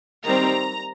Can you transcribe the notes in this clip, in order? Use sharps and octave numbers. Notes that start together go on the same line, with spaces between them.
D#3 G3 C4 A#5